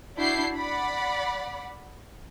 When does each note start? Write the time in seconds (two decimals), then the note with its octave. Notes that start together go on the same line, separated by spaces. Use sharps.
0.17 D4 E4 F#4 G6 C7
0.55 D5 F#5 B5